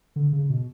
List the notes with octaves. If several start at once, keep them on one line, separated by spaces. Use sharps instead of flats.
D3
C#3
B2